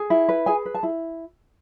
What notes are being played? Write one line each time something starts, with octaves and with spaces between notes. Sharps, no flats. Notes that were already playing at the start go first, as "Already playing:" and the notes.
Already playing: G#4
E4
B4
G#4 G#5
B4
A5
E4